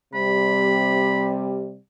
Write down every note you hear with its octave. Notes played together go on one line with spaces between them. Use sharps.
C3 G3 B5